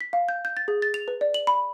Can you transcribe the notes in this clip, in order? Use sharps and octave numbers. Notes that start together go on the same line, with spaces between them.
B6
F5
G6
G6
A6
G#4
A6
F7
B4
D5
F#7
B5